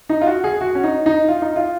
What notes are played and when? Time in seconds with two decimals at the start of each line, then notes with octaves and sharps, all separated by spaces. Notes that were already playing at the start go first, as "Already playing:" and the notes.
0.09 D#4
0.21 F4
0.27 F#4
0.44 G#4
0.61 F#4
0.75 C#4
0.84 D#4
1.06 D#4
1.28 F4
1.42 D#4
1.56 F4